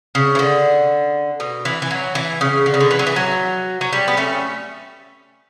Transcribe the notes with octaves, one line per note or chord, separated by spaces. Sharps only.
C#3
E3
D3
B2
E3
E3
F#3
E3
C#3
D3
C#3
D3
E3
F#3
E3
F#3
F#3
G3
B3
A3 C#4